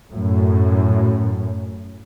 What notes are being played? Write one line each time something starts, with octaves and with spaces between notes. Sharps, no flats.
F#2 A2